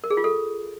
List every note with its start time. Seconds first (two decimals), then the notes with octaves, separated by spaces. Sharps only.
0.04 A#4
0.10 G#4
0.17 F4
0.24 A4